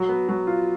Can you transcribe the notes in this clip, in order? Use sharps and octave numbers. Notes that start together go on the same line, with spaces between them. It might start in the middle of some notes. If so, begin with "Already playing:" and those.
Already playing: F#3
B3
F#3
F4